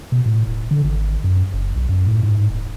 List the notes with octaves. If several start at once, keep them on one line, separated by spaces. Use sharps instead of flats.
B2
A2
D#1
D3
G#1
F#2
F#1
B1
F#2
A2
G#2
D#1